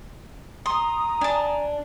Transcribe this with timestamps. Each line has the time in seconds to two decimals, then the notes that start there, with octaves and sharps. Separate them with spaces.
0.66 A#5 C6 D#6
1.21 D4 G#5 A5